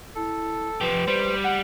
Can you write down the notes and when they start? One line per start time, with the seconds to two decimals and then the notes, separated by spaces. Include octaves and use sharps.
0.16 E4 A4
0.81 F3 G4 B4
1.08 G3 C5
1.44 F#5